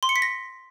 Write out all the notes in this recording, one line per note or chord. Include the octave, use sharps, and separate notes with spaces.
C6
C#7
B6
A#6